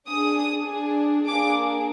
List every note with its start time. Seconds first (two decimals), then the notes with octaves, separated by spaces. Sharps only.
0.09 D4 G#4 D#6
0.68 D4 G#4
1.27 A#3 D4 G#4 D6